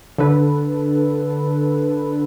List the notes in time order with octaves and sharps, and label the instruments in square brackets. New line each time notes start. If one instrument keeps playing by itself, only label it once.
[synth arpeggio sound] D3 A4 B4